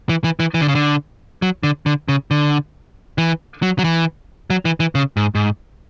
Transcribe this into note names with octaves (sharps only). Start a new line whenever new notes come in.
E3
E3
E3
E3
D3
C#3
D3
F#3
D3
D3
C#3
D3
E3
F#3
F#3
E3
F#3
E3
E3
C#3
G#2
G#2